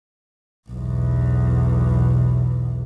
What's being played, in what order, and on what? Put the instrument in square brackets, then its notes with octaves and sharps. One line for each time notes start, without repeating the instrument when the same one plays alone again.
[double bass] B1 E2